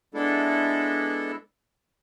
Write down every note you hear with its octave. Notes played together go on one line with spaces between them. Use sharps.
G#3 B3 D4 E4 A4